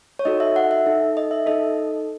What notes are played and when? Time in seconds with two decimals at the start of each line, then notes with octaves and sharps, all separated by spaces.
0.19 C#5
0.25 D#4 F#4 A4 D#5
0.40 E5
0.56 F#5
0.71 E5
0.86 D#4 A4
1.17 D#5
1.31 E5
1.46 D#4 A4 D#5